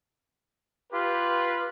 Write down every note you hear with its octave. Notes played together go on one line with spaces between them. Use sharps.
F4 G4 B4